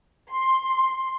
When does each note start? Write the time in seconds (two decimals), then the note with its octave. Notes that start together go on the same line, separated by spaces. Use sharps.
0.30 C6